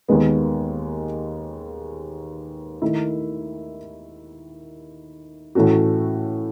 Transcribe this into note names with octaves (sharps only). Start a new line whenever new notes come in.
D#2 D#3 G#3 B3
D#3 A3 E4
A2 E3 A3 C#4 F#4